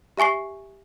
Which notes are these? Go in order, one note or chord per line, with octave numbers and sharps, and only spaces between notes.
G4 E5 G#5 C#6 C7